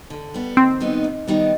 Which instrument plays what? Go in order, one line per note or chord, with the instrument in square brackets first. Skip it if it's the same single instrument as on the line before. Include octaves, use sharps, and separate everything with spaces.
[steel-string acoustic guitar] D3
G3 B3
[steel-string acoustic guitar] D#2 [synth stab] C4
[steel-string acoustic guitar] D#3 G3 B3 D#4
D#2
D#3 G3 B3 D#4